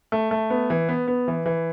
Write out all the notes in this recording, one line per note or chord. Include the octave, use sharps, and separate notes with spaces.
A3
A3
B3
E3
B3
B3
E3
E3